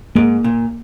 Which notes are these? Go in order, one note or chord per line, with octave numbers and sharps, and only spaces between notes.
G#2 A#3
A#2